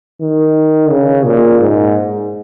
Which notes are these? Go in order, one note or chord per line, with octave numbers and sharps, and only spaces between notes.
D#3
C#3
A#2
G#2